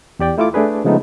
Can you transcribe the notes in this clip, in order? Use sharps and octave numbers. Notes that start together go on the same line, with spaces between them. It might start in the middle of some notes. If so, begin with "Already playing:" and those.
E2 G4 D5 G5
A3 E4 F4 A4 D6
A3 D4 G#4 B4
C#3 F3 G#3 A3 B3 D#4